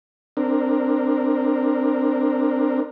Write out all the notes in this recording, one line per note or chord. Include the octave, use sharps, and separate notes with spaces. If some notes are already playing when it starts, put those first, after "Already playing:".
C4 D4 A#4